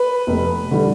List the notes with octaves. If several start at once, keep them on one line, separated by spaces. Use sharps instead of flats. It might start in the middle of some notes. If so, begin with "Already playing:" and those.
Already playing: B4
F1
D3 G3